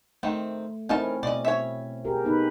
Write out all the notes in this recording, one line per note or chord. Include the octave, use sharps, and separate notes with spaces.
D#3 A3 C4
C4 C#4 D#4 E4 A#4 A5
B2 D5 D#5
C#5 E5
G4 G#4 A#4
B3 D#4 B4